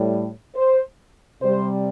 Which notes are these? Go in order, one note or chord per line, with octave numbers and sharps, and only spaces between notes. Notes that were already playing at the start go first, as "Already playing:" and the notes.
Already playing: A2 G3
C5
C3 G3 C5